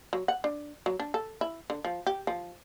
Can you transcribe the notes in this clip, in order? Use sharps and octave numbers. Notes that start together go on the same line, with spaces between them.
F#3
F#5
D4
F#3
D4
A4
E4
D3
F3
G4
F3